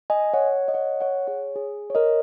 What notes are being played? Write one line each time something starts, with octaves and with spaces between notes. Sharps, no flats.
D#5 G#5
C#5 F#5
D#5
C#5 F#5
C#5 F#5
G#4 C#5
G#4
C#5
A#4 D#5